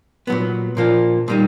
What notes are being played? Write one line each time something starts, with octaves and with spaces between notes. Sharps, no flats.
A#2 F#3 B3
A#2 F3 A#3 D4
A#2 G3 A#3 D#4